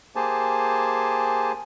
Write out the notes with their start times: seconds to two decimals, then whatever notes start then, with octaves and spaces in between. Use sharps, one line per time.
0.16 A#3 G4 G#4 C5 G#5 A5